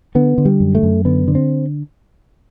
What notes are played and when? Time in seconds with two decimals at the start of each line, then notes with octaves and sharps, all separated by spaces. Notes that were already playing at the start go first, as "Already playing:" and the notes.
0.15 D3 B3
0.38 D3
0.45 G3
0.60 F#2
0.75 A3
0.83 F#2
1.05 D3 B3
1.28 D3
1.35 C4